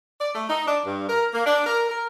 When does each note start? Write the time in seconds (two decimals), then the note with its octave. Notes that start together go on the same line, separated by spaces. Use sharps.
0.21 D5
0.35 A3
0.48 D#4
0.67 D4
0.85 G2
1.09 A#4
1.34 A#3
1.45 D4
1.66 A#4
1.89 A#4